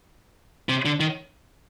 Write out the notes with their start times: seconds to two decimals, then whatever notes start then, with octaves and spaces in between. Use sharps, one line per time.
0.69 C3
0.85 D3
1.00 D#3